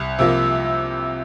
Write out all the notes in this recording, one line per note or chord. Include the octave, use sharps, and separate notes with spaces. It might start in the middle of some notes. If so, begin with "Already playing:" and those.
Already playing: C2
C3 F3 A#3